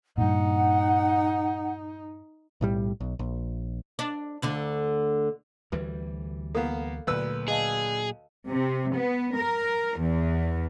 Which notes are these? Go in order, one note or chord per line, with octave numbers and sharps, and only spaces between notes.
G2 A#2 D#4 F#5
B1 A2 G3
B1
A#1
D4
D2 D3 D4
D2 E3 G3 B4
A#3 B3 A4 F5
D2 A#2 F#3 B4 E6
G#4 D#5 F5 A5
C3
B3
A#4
E2